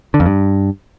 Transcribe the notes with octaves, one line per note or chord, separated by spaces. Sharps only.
D3
F2
G2